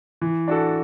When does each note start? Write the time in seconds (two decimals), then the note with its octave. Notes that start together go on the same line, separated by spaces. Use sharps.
0.21 E3
0.48 D4 F#4 A4